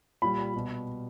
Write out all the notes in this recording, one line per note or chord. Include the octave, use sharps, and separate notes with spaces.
A#2 G3 B5
B2 G3